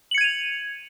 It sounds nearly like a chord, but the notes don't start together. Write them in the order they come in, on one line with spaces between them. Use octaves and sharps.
F#7 C#7 G#6 D#7 F7